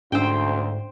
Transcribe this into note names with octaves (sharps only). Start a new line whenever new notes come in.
D2 G#2 C#4 D4 C5 G5 E6